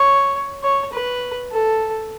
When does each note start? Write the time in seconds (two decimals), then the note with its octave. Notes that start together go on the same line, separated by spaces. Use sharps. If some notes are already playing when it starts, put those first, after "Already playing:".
Already playing: C#5
0.63 C#5
0.92 B4
1.51 A4